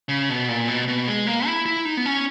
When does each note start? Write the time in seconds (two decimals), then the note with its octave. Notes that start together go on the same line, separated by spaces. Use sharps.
0.09 C#3
0.29 B2
0.48 A#2
0.68 B2
0.88 B2
1.08 G#3
1.27 A#3
1.46 E4
1.66 E4
1.85 D#4
1.97 B3
2.06 C#4